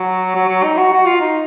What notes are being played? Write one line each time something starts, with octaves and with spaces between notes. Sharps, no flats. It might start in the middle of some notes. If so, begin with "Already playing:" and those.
Already playing: F#3
F#3
F#3
D#4
F#4
F#4
F4
D#4